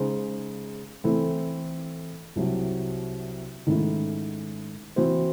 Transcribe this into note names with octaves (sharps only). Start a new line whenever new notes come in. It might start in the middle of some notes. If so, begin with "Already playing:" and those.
Already playing: C#3 G#3 D#4 G#4 C5
E3 A3 C4 E4 A4
C2 C3 F#3
G#2 D#3 A3 C#4 E4
E3 C4 F#4 C5